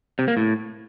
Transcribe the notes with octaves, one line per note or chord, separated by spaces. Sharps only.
C3
A#3
A2